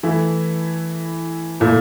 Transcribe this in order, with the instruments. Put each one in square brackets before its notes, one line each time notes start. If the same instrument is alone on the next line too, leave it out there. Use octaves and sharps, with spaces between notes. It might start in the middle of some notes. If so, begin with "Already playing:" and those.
[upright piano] E3 A3 E4
A#2 A3 E4